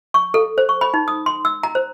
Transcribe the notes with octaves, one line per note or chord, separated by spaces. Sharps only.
C#6
A4
C5
C#6
B5
D#4
D#6
C6
E6
A#5
C5